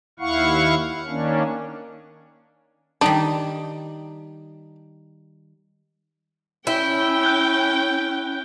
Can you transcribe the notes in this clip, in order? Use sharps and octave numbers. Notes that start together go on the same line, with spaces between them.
D#2 E4 F5 F#5 C#6
D#3 A#3 C#4 D4
D#3 G3 D4 D#4
C#4 E4 G5
F#6 G6 G7